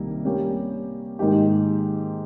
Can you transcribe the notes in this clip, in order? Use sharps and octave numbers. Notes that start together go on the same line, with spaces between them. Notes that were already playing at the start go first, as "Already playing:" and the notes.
Already playing: C2 C3 D#3 G3 A#3
G3 A#3 C#4 G4
G#2 D#3 A#3 D#4 G4